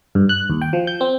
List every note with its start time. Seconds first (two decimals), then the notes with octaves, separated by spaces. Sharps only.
0.15 G2
0.29 F#6
0.50 D#2
0.62 G5
0.73 F3
0.87 G6
1.01 C4